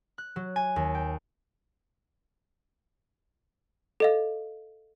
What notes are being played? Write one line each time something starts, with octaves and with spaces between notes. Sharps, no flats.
F#6
F#3
G#5
D#2
G5
A4 D#5 F5